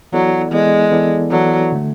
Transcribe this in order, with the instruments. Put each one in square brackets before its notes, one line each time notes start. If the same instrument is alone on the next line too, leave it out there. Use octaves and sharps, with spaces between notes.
[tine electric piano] E3 B3 E4 A4 D5 [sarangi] F#3
[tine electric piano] E3 B3 E4 A4 D5 [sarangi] G#3
[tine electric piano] E3 B3 E4 A4 D5
[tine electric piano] E3 B3 E4 A4 D5 [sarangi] F#3
[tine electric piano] D3 A3